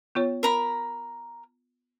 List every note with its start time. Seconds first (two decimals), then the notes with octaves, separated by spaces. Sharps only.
0.15 B3 F4 C#5
0.43 A#4 A#5 B5